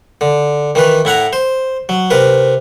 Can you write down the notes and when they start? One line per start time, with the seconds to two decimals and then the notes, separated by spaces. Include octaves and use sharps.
0.21 D3
0.75 D#3 E3 B4
1.05 A2 E4 F#5 A#5
1.33 C5
1.89 F#3
2.10 C3 A#4 B4